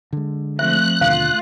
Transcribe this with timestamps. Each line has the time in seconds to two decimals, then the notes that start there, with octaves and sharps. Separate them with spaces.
0.13 D3 G#3
0.59 F3 A3 C4 E5 F#6
1.01 D#2 B2 D3 A3 F4 F5